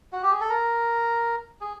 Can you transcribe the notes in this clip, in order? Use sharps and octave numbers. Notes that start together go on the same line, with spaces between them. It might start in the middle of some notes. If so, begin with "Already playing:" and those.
F#4
G4
G#4
A4
A#4
G#4